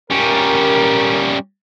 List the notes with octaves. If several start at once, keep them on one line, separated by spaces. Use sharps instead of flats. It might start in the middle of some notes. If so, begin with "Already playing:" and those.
G3 C#4 A#4